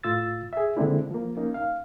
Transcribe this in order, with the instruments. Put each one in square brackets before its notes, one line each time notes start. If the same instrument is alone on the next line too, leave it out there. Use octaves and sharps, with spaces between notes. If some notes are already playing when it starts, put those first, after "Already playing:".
[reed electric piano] A2 F4 E6 A6
G#4 E5
D3 G#3 A#3 C4 D4 E4
F3 A#3
A#3 C#4 D#4
F5